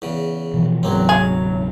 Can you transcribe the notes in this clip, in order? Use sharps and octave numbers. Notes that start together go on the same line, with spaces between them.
E2 C#3
B2 E3 F3
D1 E2 G#2 C3 F#3 A#3 C4
G#4 F5